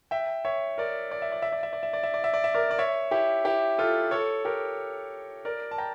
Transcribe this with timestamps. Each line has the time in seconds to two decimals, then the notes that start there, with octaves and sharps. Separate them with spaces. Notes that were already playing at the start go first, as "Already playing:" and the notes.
0.11 E5 G5
0.45 C#5 E5
0.78 A#4 D5
1.11 D5
1.22 E5
1.32 D5
1.42 E5
1.52 D5
1.63 E5
1.73 D5
1.83 E5
1.93 D5
2.03 E5
2.14 D5
2.24 E5
2.34 D5
2.44 E5
2.54 A#4 D5
2.71 D5
2.79 C#5 E5
3.11 E4 G4
3.45 E4 G4
3.78 F4 A4
4.11 A4 C#5
4.45 G4 A#4
5.45 A#4 D5
5.71 A5
5.78 G5 A#5